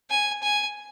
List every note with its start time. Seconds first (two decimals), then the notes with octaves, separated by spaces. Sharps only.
0.10 G#5
0.42 G#5